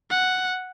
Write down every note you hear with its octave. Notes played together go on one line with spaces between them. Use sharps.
F#5